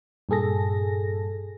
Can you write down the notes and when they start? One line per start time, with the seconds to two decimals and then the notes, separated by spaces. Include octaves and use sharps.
0.29 G2 A#2 G#4 A4 A#6